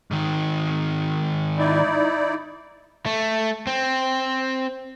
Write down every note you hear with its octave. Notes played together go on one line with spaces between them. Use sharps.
G#2 D#3
D#4 E4 D5
A3
C4